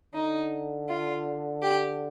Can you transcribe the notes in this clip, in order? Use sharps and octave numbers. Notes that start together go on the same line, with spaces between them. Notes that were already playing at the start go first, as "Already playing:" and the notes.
D3 D#4
F4
G4